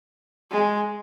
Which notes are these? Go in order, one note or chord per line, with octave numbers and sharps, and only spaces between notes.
G#3